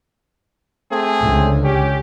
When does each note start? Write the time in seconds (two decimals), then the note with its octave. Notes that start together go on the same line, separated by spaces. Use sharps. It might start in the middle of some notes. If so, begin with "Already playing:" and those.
0.91 A3 C4 G#4
1.23 C#2 D3
1.64 C#4 G4